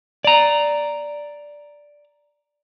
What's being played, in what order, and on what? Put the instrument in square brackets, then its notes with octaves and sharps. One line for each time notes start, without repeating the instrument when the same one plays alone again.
[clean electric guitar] D5 A#5